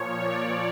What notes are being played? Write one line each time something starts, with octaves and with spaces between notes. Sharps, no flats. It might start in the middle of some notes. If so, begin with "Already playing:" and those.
Already playing: A#2 F3 C#5
D5